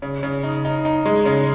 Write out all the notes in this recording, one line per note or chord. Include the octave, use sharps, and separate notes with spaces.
C#3
C#3
D#4
D#4
D#4
G#3
C#3